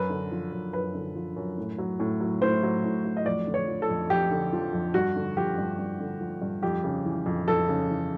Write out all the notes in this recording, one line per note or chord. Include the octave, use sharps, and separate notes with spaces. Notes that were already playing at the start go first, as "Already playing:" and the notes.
Already playing: F#2 B4
D3
F3
F#2
F#2 B4
D3
F3
F#2
A2
F#3
A2
F#3
A2 C5
F#3
A2
F#3
D#5
F2 D5
D3
C#5
F3
A4
F2
F2 G4
D3
F3
F2
G2 F#4
D3
F3 G4
G2
G2
D3
F3
G2
F2 G4
C#3
E3
F2
F2 A4
C#3
E3